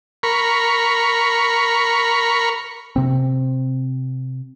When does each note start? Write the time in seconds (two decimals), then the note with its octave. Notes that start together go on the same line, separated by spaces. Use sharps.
0.23 A#4 B5 C#6
2.96 C3 C4